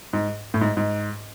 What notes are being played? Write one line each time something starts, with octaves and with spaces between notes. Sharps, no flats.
G#2
A2
G#2
G#2